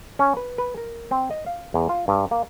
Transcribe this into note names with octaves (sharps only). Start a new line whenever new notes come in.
C#4
B4
B4
A#4
C4
D#5
F5
E2
F4
G2
A#3